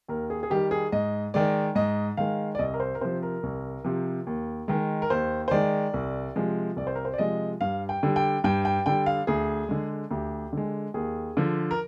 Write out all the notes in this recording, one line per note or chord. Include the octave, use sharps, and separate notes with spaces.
D#2 A#4
G#4
G#4
D#3 G3 G4
G#4
G#2 D#5
D#3 G#3 D5
G#2 D#5
D#3 G#3 F5
D5
C2 D#5
A#4
C5
A#4
C3 F3 C5
A#4
C2
C3 F3
D#2
D#3 G#3
A#4
D#2 C5
C5
D#3 G#3 D5
C2
C3 F3 G#3
C2 D5
C5
A#4
C5
D5
C3 F3 G#3 D#5
G2 F5
G5
D3 G3
G5
G2 G5
G5
D3 G3 G5
F5
D2 G#4
D3 G#3
D2 G4
D3 G#3
D#2 G#4
D3 F3
A#4